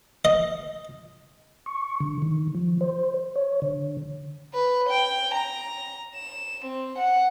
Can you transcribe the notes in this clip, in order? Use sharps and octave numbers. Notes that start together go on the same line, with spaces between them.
D#5
C#6
D3
D#3
F3
C5
C#5
D3
B4
G5
A#5
E7
C4
F#5